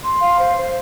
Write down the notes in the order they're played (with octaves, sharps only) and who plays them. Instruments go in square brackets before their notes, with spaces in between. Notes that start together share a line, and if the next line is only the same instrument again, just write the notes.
[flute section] C6
F5
C5
C5